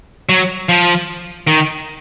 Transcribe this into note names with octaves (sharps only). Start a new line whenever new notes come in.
F#3
F3
D#3